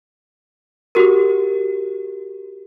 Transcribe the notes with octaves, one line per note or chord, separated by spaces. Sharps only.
F#4 G4 A#4